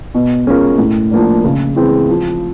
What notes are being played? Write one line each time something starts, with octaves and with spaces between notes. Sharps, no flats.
B2
G#3 C#4 F4 A#4
A2
F3 A#3 D4
C#3
E3 G#3 C4
F3